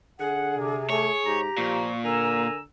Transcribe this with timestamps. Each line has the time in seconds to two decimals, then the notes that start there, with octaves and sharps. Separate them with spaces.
0.19 D3 G#4 F#5
0.57 C3
0.90 A3 G#4 C#5
1.26 G#2 G4 A#5
1.58 A#2 F3 C#6
2.04 D3 A#4 G#5 A#5 E6